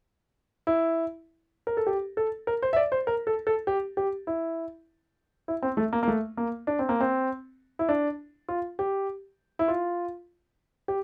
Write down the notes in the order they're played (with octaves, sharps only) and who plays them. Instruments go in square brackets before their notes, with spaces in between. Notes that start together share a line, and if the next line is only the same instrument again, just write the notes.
[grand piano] E4
A#4
A4
G4
A4
A#4
C5
E5
D5
C5
A#4
A4
A4
G4
G4
E4
E4
C4
A3
A#3
A#3
A3
A#3
D4
C4
A#3
C4
E4
D4
F4
G4
E4
F4
G4